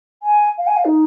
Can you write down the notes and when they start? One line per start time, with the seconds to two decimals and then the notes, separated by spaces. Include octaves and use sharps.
0.23 G#5
0.58 F5
0.67 G#5
0.77 F5
0.85 D#4